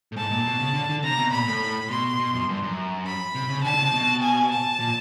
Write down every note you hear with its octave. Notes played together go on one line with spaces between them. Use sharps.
A2
G#2 A5
A#2
B2
C#3
D3
D3
C3 A#5
B2
A#2 B5
A2
B2 C6
B2
F#2
G2
F#2
B5
C3
C#3
D3 A5
C#3
C3
B2
G#5
A5
A#2